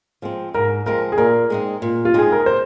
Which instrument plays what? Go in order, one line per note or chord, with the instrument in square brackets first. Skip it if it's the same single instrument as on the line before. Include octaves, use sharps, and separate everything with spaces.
[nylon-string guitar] F3 G#3 C4
[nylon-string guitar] G#2 [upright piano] A#4
[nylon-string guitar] F3 G#3 C4 [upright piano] A#4
[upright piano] G#4
[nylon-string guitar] A#2 [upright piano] A#4
[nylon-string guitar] G#3 C4 D#4
A#2
[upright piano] F4
[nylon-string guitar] G#3 C4 D#4 [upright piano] G#4
[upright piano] A#4
C5